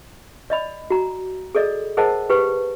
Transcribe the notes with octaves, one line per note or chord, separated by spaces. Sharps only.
D5 D#5 B5
F#4 A#5
G#4 A4 D5 D#5
G#4 A#4 C5 D#5 F#5 A5
G4 B4 G5